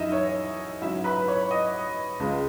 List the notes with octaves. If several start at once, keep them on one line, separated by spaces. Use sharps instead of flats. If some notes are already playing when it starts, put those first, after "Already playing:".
Already playing: F#2 E3 D#4 E4 D#5 E5
C#5
G#2 F#3 C#4 E4 E5
B4 B5
C#5 C#6
D#5 D#6
C#2 C#3 G#3